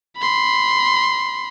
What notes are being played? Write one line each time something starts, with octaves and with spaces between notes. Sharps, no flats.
B5 C6